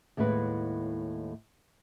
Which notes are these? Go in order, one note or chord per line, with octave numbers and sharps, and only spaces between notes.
D#2 A2 G#3 E4 B4 F#5